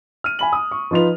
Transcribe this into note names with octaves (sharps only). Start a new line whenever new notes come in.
F6 D#7
G#5 B5 F#7
D#6
C#6
F3 D#4 F4 B4 F7